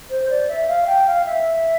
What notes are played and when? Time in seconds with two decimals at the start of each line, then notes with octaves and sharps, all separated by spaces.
0.10 C5
0.29 D5
0.49 E5
0.68 F5
0.87 G5
1.06 F5
1.25 E5